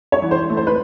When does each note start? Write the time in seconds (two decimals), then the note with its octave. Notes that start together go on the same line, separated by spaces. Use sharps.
0.12 C#5
0.22 E3
0.31 C5
0.50 A3
0.57 C5
0.67 B4